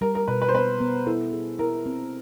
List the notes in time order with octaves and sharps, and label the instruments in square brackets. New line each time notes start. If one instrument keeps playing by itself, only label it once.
[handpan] G3 [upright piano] A#4
[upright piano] A#4
[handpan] B2 [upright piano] B4
[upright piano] B4
C5
[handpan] B3 [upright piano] B4
[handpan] B3
[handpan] E4 [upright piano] A4
[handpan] G#4
[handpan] E4 [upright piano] A#4
[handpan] C4